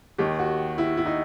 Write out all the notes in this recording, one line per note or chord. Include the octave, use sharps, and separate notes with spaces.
D#2 D#3 G4
F#4
E4
E4
D#4